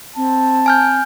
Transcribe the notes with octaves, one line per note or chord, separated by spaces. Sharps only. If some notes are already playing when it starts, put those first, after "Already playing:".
C4 A5
G#5 F6 G6